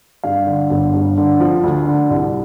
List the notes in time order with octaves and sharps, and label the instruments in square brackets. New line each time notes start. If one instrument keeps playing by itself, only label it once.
[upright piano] G2 F5
D3
G1
G2
D3
F3
D2
D3
C2